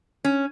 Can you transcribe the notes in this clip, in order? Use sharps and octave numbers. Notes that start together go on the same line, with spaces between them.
C#4